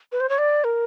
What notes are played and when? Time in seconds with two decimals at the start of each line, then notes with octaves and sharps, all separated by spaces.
0.12 B4
0.20 C5
0.29 C#5
0.38 D5
0.64 A#4